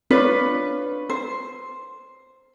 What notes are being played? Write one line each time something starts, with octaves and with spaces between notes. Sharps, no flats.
D4 F4 B4 C#5
C5